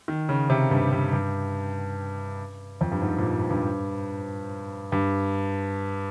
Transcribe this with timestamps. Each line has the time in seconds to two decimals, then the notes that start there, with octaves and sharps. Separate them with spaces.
0.08 D#3
0.29 C#3
0.50 C3
0.71 G2
0.92 G2
1.13 G2
2.81 F2
2.92 G2
3.02 G#2
3.18 A#2
3.50 G2
4.92 G2